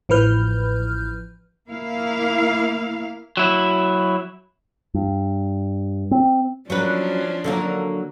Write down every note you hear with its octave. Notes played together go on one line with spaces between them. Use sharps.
A1 E3 F3 B4 F6 G6
A#3 E4 F5
F#3 E4
G2
C4
F3 F#3 A#3 C#4 D4 B4
D3 F#3 A#3